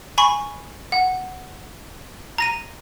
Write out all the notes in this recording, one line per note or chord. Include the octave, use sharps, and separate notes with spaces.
G#5 B5 C#6
F#5
A#5 A#6 D#7